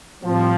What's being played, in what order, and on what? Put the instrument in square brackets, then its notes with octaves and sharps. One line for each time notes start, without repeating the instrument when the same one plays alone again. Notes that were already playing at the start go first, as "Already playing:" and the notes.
[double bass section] A2 G3 C4 [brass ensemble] F3